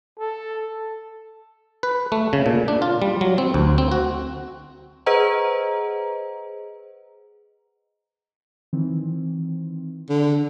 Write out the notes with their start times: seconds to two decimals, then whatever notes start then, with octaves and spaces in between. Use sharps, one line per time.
0.20 A4
1.83 B4
2.12 A3
2.33 C#3
2.46 A#2
2.68 D4
2.82 F4
3.02 G3
3.21 F#3
3.38 C4
3.54 D2
3.78 C4
3.92 F#4
5.06 G#4 B4 C5 D#5 F#5 A#5
8.73 D#3 E3 C4
10.09 D3